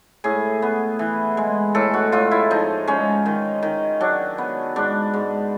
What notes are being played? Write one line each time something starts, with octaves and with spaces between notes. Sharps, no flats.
A2 G#4
B3
E3
G#3
A2 A4
F#4
A2 F4
E4
F3 D#4
G#3 C#4
D#3
D#3
F#3 D4
B3
G#2 D4
G#2